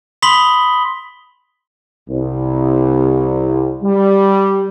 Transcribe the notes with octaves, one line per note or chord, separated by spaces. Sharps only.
B5 C6 D#6 B6 F#7 G7
C2
G3